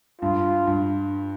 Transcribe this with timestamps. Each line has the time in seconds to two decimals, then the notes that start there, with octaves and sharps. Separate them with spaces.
0.21 G2 F4
0.67 G2